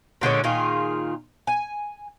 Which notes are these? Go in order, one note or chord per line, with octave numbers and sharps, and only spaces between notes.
A#2 D3 G#3 C#4
A#2 D#3 F4 G#4
G#5